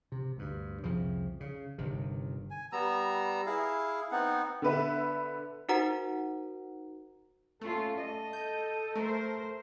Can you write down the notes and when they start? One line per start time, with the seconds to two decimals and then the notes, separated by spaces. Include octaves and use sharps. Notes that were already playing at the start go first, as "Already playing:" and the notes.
0.12 C3
0.37 D2 G2
0.83 C2 F2 C#3 F3
1.40 C#3
1.78 G1 C3 D#3
2.51 G#5
2.72 G3 B3 A#5 E6
3.46 E4 G#4 F5
4.11 B3 C4 D#4 F#5
4.62 D3 B3 B4 E5
5.69 D#4 F#4 A#4 C5 F#5 A#5
7.61 A3 A#3 C#4 F4 A4
7.97 A4 D#5
8.33 G6
8.95 A3 A#4 C5